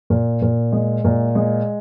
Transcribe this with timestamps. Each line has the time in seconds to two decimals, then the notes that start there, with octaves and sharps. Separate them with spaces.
0.10 A#2
0.42 A#2
0.72 G#3
1.04 A#2
1.35 G#3